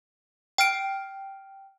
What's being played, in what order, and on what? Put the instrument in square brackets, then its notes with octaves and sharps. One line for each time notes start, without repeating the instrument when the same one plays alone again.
[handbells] G5 F6 D7